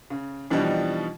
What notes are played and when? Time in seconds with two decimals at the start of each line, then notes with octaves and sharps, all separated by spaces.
0.10 C#3
0.50 B2 E3 F3 G3 D4 D#4